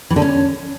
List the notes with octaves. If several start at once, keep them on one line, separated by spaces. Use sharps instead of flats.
E3
D3
C#4